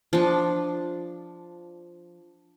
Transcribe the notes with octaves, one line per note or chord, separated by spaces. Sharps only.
F3 D4